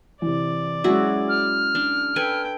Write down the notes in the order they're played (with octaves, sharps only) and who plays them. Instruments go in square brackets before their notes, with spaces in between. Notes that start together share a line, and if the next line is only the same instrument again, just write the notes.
[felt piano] C3 E3 [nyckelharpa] D5
[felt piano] F#3 G#3 C#4 [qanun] E4 F#4 G#4
[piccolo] F6
[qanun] D4
[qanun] A4 B4 G#5 [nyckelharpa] G5